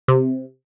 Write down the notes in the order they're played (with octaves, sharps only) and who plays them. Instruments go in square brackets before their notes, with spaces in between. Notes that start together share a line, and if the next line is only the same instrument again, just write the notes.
[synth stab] C3